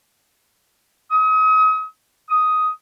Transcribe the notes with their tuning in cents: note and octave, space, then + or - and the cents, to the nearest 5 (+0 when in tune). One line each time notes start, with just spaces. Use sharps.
D#6 +35
D#6 +5